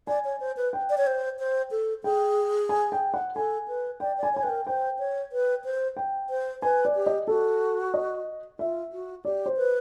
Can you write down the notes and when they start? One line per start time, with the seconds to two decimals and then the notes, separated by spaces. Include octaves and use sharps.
0.07 D5 G#5
0.25 C#5
0.40 C5
0.57 B4
0.73 G5
0.90 D5
0.98 C#5
1.07 C5
1.39 C5
1.71 A4
2.04 G#4 G5
2.69 G#5
2.92 G5
3.14 F#5
3.36 A4 G#5
3.68 B4
4.00 D5 G5
4.18 D5
4.23 G#5
4.33 C#5 G#5
4.43 B4 G5
4.50 A#4
4.67 C5 G5
4.99 C#5
5.32 B4
5.65 C5
5.97 G5
6.30 C5
6.62 B4 G#5
6.85 D5
6.96 G4
7.06 D#5
7.27 F#4 A4
7.94 D#5
8.59 F4 E5
8.92 F#4
9.25 G4 D5
9.46 C5
9.57 B4